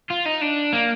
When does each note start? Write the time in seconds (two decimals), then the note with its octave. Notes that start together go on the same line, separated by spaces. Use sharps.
0.10 F4
0.25 D#4
0.41 D4
0.73 A#3